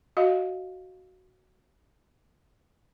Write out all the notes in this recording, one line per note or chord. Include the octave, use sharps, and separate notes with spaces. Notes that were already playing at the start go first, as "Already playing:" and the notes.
F#4 D#5 F5